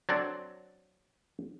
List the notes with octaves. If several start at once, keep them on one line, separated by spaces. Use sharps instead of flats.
F#3 C4 D4 A4 D5